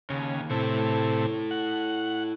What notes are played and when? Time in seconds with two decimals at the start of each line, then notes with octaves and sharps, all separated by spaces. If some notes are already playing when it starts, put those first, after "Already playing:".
0.10 D#2 C#3
0.50 A2 C3 E4 A4
1.51 F#5